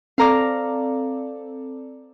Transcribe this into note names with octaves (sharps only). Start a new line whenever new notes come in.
C4 A4 D5 F5 A#5 D6